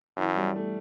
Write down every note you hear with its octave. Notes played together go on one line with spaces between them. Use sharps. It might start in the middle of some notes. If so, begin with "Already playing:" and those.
F#2 E3
G3
A3